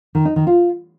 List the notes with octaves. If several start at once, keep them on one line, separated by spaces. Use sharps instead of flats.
D#3
D#4
D#3
F4